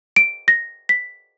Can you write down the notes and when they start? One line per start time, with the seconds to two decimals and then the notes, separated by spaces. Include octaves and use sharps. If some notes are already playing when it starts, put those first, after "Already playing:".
0.16 D7
0.48 A#6
0.89 B6